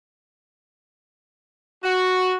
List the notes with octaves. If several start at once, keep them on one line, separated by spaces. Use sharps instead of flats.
F#4